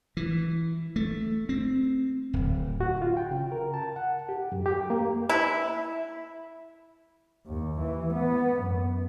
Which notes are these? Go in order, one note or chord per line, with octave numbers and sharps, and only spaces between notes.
E3
A3
C4
D1
F#4
F4
G5
C#3
A#4
A5
F#5
G4
F#2
G4
A#3
E4
D#2
E3
B3
F#2